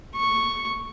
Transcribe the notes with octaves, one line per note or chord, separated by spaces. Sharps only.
C#6